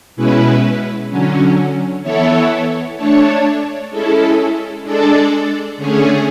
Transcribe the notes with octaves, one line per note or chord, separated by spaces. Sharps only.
B2 G#3 C#4 E4 B4
D3 F#3 C#4
E3 B3 E4 A4 C#5
A3 D4 A4 C#5
G#3 C#4 E4 A4
G#3 D4 A4 D5
D3 A3 C#4 G#4